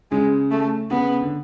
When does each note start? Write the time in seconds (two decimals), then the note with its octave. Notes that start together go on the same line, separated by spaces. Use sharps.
0.12 C#3 G#3
0.51 A3
0.91 C#3 B3
1.21 D3